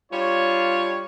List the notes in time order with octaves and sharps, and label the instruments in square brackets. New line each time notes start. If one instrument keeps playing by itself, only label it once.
[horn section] G3 D4 F4 C#5